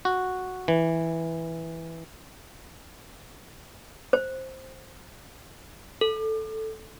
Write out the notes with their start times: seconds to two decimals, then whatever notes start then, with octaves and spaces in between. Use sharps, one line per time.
0.05 F#4
0.68 E3
4.13 C5
6.01 A4